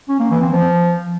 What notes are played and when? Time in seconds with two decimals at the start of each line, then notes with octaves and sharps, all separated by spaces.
0.09 C#4
0.20 A#3
0.30 E3
0.41 C4
0.52 F3